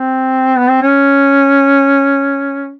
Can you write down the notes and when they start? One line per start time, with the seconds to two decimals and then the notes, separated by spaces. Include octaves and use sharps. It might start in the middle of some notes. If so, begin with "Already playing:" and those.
Already playing: C4
0.58 B3
0.70 C4
0.82 C#4